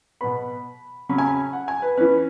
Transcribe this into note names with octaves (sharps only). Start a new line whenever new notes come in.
B2 B3 B5
C#3 F#3 C#4 B5
G#5
B5
F#5
G#5
B4
E3 C#4 B4